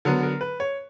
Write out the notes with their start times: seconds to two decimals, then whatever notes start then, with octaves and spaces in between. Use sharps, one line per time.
0.05 D3 F#3 B3 A#4
0.23 A#4
0.41 B4
0.60 C#5